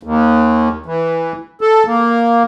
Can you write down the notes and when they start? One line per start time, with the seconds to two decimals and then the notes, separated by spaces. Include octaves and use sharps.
0.03 D#2
0.86 E3
1.61 A4
1.86 A#3